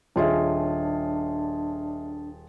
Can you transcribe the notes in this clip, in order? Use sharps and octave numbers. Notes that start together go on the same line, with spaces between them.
D#1 D4 F4 G#4 C#5 D#5 E5